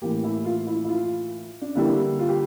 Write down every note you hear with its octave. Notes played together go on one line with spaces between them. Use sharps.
A2 E3 A#3 G4
E4
F4
E4
E4
F4
D4
D3 G3 A#3 E4
F4
G4